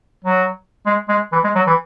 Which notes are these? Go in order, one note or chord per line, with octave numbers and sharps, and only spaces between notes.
F#3
G#3
G#3
E3
G#3
F#3
E3